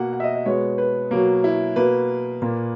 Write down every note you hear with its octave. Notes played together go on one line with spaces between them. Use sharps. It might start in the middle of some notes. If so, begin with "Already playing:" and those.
Already playing: B2 A#3 F#5
F#5
E5
D#5
D#5
B2 G#3 B3 C#5
B4
B2 F#3 A#3
E4
B2 A#3 B4
A#2 A#3